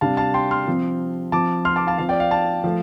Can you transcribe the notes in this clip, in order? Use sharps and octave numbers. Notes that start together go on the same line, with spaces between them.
C3 G3 D4 F5 A5
F5 A5
G5 C6
C6 F6
C3 F3 C4
F3 C4 A5 D6
C6 F6
A5 D6
F5 A5
F3 C4 F5
D5 G5
F5
F5 A5
F3 A3